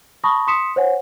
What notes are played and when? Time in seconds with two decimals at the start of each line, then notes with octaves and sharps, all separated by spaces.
0.24 A5 B5 C#6 D#6 A#6
0.47 C6 D#6 B6 C#7 E7
0.76 C5 C#5 F#5 G#5